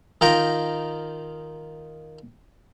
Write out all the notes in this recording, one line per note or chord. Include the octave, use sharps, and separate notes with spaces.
D#3 D#4 F4 G5 A#5